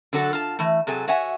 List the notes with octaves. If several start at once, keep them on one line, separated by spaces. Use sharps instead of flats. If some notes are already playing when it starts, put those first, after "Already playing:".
D3 F#3 F#4 A4
F4 A5
E3 A3
C3 F#3 G#4 A4 G#5
F#4 C#5 E5 F#5 G#5